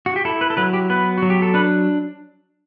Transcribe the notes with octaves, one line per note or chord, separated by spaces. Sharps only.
F#4
G4
E4 A4
B4
A4
F#3 B4
G4
B3 B4
F#3 F#4
G4
A4
D4 B4